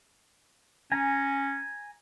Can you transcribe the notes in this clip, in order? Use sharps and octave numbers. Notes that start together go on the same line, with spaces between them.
C#4 G#5 A#5